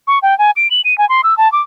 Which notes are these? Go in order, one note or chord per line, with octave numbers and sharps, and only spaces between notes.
C#6
G5
G#5
D7
F#7
D#7
G#5
C6
E6
A5
D6